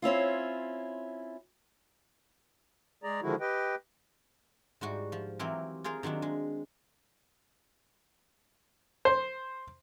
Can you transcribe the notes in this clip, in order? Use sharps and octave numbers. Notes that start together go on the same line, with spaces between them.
C4 C#4 E4 F4
G#3 G#4 D5 A#5
D3 D#3 F3 G#3 E4 F#4
G4 B4 D#5 G5
G#2 G3 F#4
F3
E3 F#3 C4 G4 A#4
F4 G#4 A#4 C5
D#3 F#3 C4 D4
G#3
C5